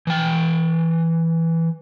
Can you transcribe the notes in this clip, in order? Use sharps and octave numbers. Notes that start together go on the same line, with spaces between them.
E3 G5